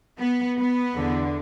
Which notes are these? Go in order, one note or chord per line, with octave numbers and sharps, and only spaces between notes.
B3
B3
E2 D3